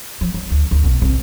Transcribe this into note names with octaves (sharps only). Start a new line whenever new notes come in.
F3
F#3
D2
D2
B1
C2